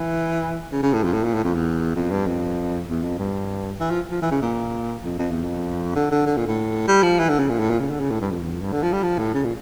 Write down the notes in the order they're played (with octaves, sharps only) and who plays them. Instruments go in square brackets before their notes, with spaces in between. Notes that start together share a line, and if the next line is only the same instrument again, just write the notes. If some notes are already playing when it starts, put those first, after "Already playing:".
Already playing: [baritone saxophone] E3
C#3
C#3
A2
F2
A2
A#2
A2
F2
E2
F2
G2
F2
E2
F2
G2
E3
F3
F3
E3
C#3
A#2
F2
F2
E2
F2
D3
D3
D3
A#2
A2
G3
F3
E3
D3
C#3
A#2
A2
A#2
C#3
D3
C#3
A2
G2
F2
E2
F2
G2
D3
F3
G3
F3
A2
C#3
A#2